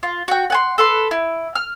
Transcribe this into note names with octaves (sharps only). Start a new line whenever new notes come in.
F4
F#4 G5
F#5 G#5 C6
A4 B4 C6
E4
F6